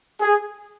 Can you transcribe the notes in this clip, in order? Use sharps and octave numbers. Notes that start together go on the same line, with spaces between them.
G#4